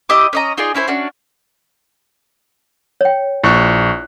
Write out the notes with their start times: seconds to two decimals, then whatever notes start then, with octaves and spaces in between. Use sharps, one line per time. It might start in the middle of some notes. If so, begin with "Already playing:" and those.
0.09 E4 G4 D#5 D6
0.33 C#4 D#5 A#5
0.57 D#4 F4 G#4 D5
0.75 C#4 E4 A4 C5
0.88 C#4 D4 F#4
3.01 C#5 G5
3.43 A#1 E4 C#6 F#6